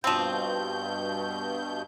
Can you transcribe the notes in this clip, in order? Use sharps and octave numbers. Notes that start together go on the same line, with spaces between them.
G2 B2 F3 C4 G6